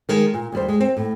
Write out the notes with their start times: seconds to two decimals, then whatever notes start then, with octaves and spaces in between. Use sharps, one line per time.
0.09 D#3 G#3
0.34 A#2
0.52 D#2 G3 C5
0.68 G#3
0.80 C4
0.97 A2